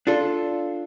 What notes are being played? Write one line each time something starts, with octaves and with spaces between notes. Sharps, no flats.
D4 F4 A4